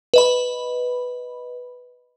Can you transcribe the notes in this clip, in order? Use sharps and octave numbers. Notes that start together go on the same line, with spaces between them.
B4 D#5 B5